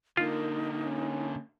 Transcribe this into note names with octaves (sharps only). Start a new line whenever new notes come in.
D3 A#3 D#4 F4 A#4
C#4